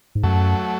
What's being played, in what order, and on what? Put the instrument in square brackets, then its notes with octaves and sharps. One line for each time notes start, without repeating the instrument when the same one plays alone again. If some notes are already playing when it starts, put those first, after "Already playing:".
[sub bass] G#2
[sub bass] F#2 [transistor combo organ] F#3 A3